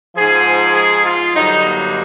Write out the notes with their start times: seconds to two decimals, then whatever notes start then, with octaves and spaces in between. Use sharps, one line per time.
0.16 G#2 F3 G#4
0.75 G#4
1.06 F4
1.35 G2 D3 F#3 D#4
1.65 A#3